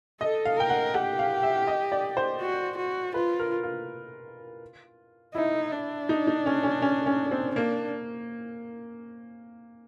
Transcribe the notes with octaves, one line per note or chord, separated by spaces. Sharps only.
A4 D#5
F5
A#4 G5
F#5
G4 F#5
F5
E5
D#5
D5
C5
F#4
F#4
F4 B4
A#4
F4
D#4 E4
D4
D#4
D#4
C#4
C#4
C#4
C#4
C4
A#3 D4